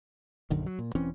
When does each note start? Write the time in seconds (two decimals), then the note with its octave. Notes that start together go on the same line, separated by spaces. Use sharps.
0.50 A#1 F#2 D3 D#3
0.66 F#3
0.79 A#2
0.95 E1 E3 C4 C#4